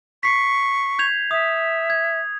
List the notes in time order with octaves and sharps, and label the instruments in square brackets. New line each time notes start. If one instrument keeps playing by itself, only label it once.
[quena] C#6 [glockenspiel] B6 C7
[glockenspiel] G6 G#6 F7
[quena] E5 [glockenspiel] D#6
[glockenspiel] G#6